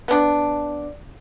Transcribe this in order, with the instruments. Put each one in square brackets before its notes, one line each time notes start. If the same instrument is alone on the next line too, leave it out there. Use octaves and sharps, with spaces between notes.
[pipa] B3 D4